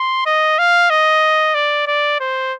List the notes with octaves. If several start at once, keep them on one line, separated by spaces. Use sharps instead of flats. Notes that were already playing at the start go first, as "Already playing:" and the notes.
Already playing: C6
D#5
F5
D#5
D5
D5
C5